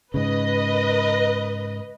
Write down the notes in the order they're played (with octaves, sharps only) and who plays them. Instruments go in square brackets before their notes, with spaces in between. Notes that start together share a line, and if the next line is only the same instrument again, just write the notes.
[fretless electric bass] G#2 C#3 [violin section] B4 D#5